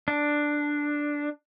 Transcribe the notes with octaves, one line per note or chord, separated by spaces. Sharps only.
D4